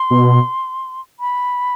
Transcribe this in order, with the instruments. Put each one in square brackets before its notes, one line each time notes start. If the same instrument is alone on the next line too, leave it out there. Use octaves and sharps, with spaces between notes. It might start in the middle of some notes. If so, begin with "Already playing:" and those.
Already playing: [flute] C6
[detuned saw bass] B2
[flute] B5